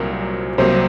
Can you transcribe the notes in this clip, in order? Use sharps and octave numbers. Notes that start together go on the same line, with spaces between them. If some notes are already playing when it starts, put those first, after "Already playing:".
Already playing: C2 A#2 F#3 C4 A#4
C2 C3 F#3 A#3 C5